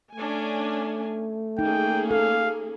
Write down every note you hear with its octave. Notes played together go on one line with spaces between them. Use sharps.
A3 C#4 D4 G#5
A#3 C#4 D#4 G#4 G5
A4 F5